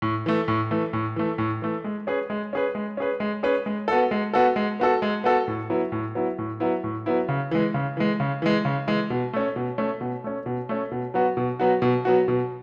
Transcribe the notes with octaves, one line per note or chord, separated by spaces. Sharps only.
A2
E3 A3
A2
E3 A3
A2
E3 A3
A2
E3 A3
G#3
C#4 G#4 B4
G#3
C#4 G#4 B4
G#3
C#4 G#4 B4
G#3
C#4 G#4 B4
G#3
B3 F#4 A4
G#3
B3 F#4 A4
G#3
B3 F#4 A4
G#3
B3 F#4 A4
A2
F#3 B3 E4
A2
F#3 B3 E4
A2
F#3 B3 E4
A2
F#3 B3 E4
C#3
E3 G#3
C#3
E3 G#3
C#3
E3 G#3
C#3
E3 G#3
B2
A3 C#4
B2
A3 C#4
B2
A3 C#4
B2
A3 C#4
B2
F#3 B3 F#4
B2
F#3 B3 F#4
B2
F#3 B3 F#4
B2